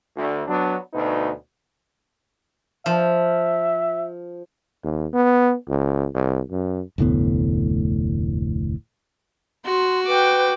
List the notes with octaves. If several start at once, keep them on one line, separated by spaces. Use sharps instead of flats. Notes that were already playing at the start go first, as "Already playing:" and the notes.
D2
F#3 B3 D4
D2 B2 D#4 B4
F3 E5
D#2
B3
C#2
C2
F#2
F1 D2 A2 B3
F#4 C6
B4 G5 D6